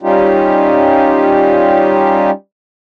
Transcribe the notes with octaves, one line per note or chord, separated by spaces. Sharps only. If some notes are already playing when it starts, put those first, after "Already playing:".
G3 C#4 D#4 F4 G4